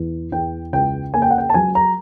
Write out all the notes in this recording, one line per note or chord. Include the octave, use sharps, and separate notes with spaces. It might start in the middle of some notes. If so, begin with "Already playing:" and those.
Already playing: E2
E2 G5
C#2 G5
A#3 G#5
G5
F#5
G5
A5
F#3 G#5
A#5